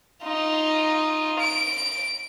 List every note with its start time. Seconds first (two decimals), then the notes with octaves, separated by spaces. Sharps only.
0.24 D#4 F4
1.39 D7